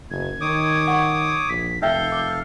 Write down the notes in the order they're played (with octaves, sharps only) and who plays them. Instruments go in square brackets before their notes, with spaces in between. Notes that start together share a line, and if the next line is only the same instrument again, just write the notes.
[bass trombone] F#1 [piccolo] G#6
[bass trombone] D#3 [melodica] C#5 D6 D#6
[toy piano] F#5 C#6
[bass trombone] A#1 [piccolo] B6
[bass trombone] F1 [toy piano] D#4 E5 G5 [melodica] A4 F5 [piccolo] G6
[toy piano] D6